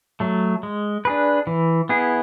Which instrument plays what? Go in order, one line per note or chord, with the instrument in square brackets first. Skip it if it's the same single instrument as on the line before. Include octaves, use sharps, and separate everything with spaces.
[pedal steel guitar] F#3 A3
G#3
D4 G#4 B4
E3
B3 E4 G#4